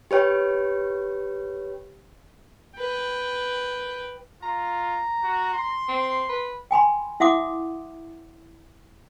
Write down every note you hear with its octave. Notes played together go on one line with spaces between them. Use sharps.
G4 B4 C#5 G5
B4 G5
F4 A#5
F#4
C6
C4
B4
G5 G#5 B5 C6
E4 E5 F#5 C6 D6 D#6